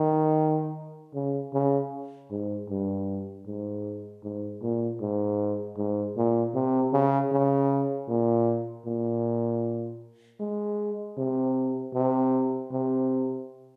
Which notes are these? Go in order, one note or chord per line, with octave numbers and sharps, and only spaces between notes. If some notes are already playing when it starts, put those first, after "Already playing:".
Already playing: D#3
C#3
C#3
G#2
G2
G#2
G#2
A#2
G#2
G#2
A#2
C3
C#3
C#3
A#2
A#2
G#3
C3
C3
C3